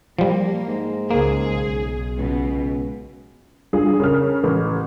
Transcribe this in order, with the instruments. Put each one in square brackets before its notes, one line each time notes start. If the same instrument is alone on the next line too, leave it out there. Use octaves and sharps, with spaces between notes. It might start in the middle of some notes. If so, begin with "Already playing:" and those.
[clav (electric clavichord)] F3 G3 [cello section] A#3
[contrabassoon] G#2
[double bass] C#2 C#3 [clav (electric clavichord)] A#3 [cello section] G#4
[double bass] B1
[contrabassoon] C#2 [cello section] B2
[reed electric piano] G3 D4 F4 [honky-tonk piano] G#4
[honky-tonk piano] C#3 F6 [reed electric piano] A#4
[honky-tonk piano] A1 [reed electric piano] B4